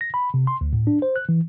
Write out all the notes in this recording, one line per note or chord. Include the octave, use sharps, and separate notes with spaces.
A#6
B5
C3
C6
D2
A2
D4
C5
F#6
E3